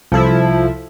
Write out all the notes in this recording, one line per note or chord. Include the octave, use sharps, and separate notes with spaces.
C2 F3 E4 A4